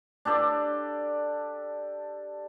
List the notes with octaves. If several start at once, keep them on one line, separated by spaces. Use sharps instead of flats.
D4 G4 A4 D5